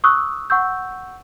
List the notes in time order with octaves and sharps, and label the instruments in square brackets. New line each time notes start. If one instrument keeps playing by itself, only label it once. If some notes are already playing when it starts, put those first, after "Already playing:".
[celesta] C#6 D#6 E6 F#6
F#5 C#6 E6 G6